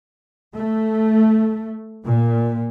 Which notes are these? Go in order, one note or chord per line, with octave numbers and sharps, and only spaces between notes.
A3
A#2